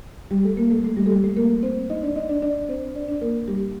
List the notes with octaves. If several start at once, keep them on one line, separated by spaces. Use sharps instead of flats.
G3 G4
A3 A4
A#3 A#4
A3 A4
A3 A4
G3 G4
A4
G3 G4
A3 A4
A#3 A#4
C4 C5
D#4 D#5
D4 D5
D#4 D#5
D4 D5
D4 D5
C4 C5
D4 D5
D4 D5
A#3 A#4
G3 G4